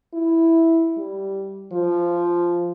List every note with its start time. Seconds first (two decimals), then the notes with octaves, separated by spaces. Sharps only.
0.14 E4
0.98 G3
1.72 F3